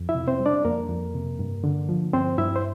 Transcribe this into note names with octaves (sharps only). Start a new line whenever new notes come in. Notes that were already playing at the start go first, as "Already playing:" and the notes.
Already playing: F2
E4 E5
C3
C4 C5
G3
D4 D5
F2 A#3 A#4
F2
C3
G2
D3
F3
G2 C4 C5
G2 E4 E5
C5